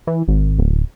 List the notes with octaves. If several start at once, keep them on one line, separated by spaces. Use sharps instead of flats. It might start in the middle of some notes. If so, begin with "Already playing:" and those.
E3
G#1
D1